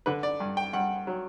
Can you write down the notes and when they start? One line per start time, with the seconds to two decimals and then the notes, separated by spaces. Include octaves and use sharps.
0.06 D3 B4
0.23 D5
0.40 G2
0.57 G5
0.73 G2 F#5
1.07 F#3